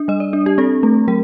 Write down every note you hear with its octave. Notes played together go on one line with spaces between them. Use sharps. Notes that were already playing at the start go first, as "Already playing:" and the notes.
Already playing: D4
G3 D#5
D5
D4
G4
C4 A4
A3
F#3 A#4